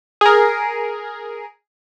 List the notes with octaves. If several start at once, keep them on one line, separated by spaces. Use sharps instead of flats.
G#4 A#4